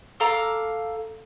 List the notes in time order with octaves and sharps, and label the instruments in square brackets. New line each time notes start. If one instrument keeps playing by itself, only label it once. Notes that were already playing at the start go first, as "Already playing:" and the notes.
[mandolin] A4 F5 A#5 D6